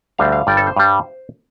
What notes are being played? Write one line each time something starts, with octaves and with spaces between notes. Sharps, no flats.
D2 D3 G3 F5
F5
G1 G2 G3 D5
A4
C5
G2 G3